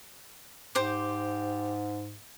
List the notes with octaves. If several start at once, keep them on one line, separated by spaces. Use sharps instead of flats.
G#2 G4 C5 D6